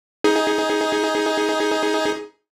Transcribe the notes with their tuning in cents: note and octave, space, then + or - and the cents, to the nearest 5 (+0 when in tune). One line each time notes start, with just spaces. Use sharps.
D#4 +20 G#4 +0